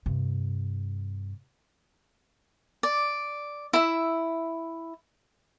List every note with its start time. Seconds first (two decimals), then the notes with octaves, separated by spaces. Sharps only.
0.06 G2 C3
2.83 D5
3.73 E4 E5